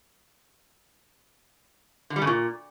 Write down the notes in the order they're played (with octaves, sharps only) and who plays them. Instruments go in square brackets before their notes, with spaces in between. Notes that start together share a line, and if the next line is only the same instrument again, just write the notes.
[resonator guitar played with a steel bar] D3
G3
C#3
A#2